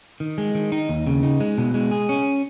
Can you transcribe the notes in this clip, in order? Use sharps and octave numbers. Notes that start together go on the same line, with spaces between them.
D#3
G#3
D#3
D#4
D#2
C#3
D#4
G#3
B2
G#3
G#4
C#4